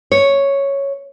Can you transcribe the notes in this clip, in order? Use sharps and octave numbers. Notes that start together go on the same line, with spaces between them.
C#5